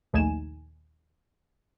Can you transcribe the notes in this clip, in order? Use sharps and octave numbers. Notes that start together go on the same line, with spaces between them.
A#1 D#2 A3 D#4 G#5 E7